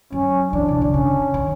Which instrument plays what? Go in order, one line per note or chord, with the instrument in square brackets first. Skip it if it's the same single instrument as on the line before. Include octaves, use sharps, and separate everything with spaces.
[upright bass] F#3 [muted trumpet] C#4
[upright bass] E3 [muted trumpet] D4
[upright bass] C3
C#3
[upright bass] D3 [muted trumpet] C#4
[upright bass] D#3